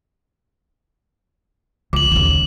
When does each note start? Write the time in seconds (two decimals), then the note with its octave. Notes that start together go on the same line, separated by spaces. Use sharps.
1.93 C#2 D6 F#7
2.12 D#2 C#3